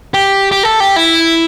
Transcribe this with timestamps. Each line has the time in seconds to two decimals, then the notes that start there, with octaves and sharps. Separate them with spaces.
0.14 G4
0.52 G4
0.63 A4
0.80 G4
0.96 E4